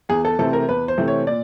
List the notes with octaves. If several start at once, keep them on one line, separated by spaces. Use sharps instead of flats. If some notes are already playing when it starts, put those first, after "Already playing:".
E2 G#4
A4
C3 E3 A3 C4 A4
A#4
E2 B4
C5
C3 E3 A3 C4
C#5
A#2 D5